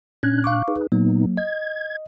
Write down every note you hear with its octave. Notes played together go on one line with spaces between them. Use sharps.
A#2 C#4 D4 F#6 G#6
F5 C#6 D6
D#4 G#4 B4
A#2 F#3 A#3 B3 D#4
D#5 G#6